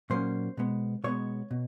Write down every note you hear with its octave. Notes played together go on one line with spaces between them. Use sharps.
A#2 F#3 A#3 C#4 C5
B2 G#3 B3
B2 G#3 B3 C#5
B2